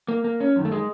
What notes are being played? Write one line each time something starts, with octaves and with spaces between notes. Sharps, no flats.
A#3
A#3
C#4
F#2 D#3
A3
G#3